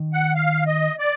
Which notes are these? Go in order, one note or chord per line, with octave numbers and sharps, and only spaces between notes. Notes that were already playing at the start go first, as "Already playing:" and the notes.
Already playing: D#3
F#5
F5
D#5
D5